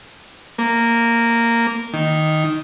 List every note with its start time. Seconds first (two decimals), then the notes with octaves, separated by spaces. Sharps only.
0.58 A#3
1.93 D#3